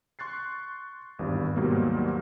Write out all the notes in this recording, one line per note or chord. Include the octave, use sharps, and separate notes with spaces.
C6 C#6 F#6 A6 C7
G#1 E2 G2
D#2 G#2 B2 F#3 G3 A#3